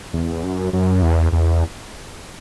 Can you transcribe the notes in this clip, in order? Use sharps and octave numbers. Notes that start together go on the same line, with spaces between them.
E2
F#2
F#2
E2
E2